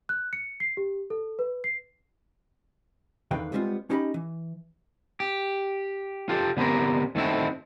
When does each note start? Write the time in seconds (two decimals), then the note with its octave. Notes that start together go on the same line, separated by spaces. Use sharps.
0.09 F#6
0.33 C#7
0.60 C7
0.77 G4
1.10 A4
1.39 B4
1.64 C7
3.31 E2 D3 D#3 B4 F5 G5
3.52 G3 G#3 B3 C4 D4 F4
3.90 C#4 D#4 G4 D#5 A#5 B5
4.14 E3
5.20 G4
6.29 F4 G4 A4
6.57 D3 B3 C4 G4 A#4
7.16 D#3 A3 C4 E4 F#4